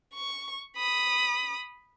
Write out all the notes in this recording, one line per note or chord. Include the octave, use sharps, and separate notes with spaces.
C#6
B5 D#6